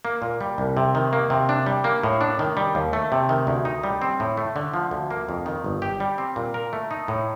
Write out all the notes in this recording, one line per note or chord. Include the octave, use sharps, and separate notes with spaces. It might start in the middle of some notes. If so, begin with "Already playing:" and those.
A#3
A#2
G3
C2
C3
D#3
A#3
C3
D4
G3
A#3
A2
D4
D#3
G3
D#2
A3
C3
D#3
D2
D#4
G3
C4
A2
A3
D3
F3
D2
A#3
F2
D#3
G1
G4
G3
C4
A#2
A#4
A3
D#4
A2